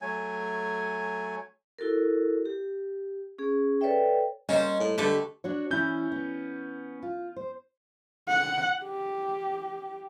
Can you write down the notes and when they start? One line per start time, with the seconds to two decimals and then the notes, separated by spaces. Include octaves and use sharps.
0.01 F#3 A3 G#5
1.79 E4 F#4 A4 A#4
2.45 G4
3.39 C#4 G#4
3.81 A4 B4 C#5 D5 E5 G5
4.49 G3 A#3 C#4 C5 D#5
4.80 A2
4.98 D3 A3 G4 B4
5.44 D4 F#4 C#5
5.71 E3 C#4 E4 G6
6.12 B3
7.03 F4
7.36 C5
8.29 F#5
8.83 G4